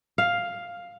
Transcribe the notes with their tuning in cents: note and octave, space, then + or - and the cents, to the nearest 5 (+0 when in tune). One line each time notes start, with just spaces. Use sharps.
F5 +5